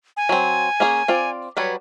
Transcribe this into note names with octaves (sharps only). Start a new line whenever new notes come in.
G#5
F#3 C4
A#3 C#4 G#4
C4 F4 D5
F#3 G3 B4 C#5